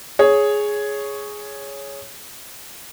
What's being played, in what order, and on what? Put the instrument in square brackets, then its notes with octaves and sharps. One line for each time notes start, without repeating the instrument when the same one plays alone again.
[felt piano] G#4 C#5